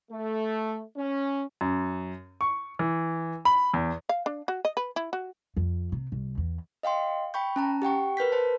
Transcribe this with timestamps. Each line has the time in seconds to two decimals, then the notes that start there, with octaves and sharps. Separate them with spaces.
0.11 A3
0.96 C#4
1.61 F#2
2.41 C#6
2.79 E3
3.45 B5
3.74 E2
4.09 F5
4.26 D4
4.48 F#4
4.65 D#5
4.77 B4
4.96 E4
5.13 F#4
5.56 F2
5.92 C3
6.12 C2
6.37 E2
6.83 D#5 F5 G5 C6
7.34 G5 B5 C#6 G6
7.56 C#4 A5 A#5
7.82 G4 F#5 G5 C#6
8.17 A#4 B4 G6 B6
8.32 B4 C5 A5